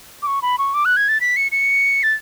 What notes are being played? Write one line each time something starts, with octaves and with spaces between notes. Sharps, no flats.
D6
C#6
B5
C#6
D6
F#6
G#6
A6
B6
C#7
C#7
A6